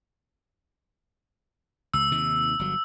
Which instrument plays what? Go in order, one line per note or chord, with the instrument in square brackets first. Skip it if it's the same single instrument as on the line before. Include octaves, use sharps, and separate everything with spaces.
[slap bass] C#2 [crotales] E6
[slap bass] D#2 C3 D#3
G1 F#3